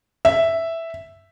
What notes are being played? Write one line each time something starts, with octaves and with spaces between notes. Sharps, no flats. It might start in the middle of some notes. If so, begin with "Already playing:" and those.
E5